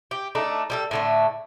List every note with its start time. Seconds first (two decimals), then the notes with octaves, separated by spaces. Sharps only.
0.11 G4
0.35 A3 D4 D#4
0.70 G3 G#4 A4
0.91 A2 D3 A3